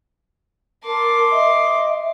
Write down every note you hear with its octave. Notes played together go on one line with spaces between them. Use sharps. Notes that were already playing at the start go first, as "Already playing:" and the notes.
A#4 A5 C6 D6
D#5 E5